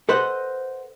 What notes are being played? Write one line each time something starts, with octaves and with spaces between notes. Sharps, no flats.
A4 B4 C5 D#5 F#5